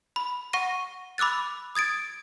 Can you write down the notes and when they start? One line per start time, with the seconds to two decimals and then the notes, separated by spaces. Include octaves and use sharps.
0.16 B5
0.53 F#5 C#6 A#6 D#7
1.18 B5 D6 E6 F#6 A6
1.75 D#6 G#6 A6 D7